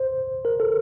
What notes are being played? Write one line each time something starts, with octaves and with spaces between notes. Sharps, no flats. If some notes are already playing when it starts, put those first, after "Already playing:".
Already playing: C5
A#4
A4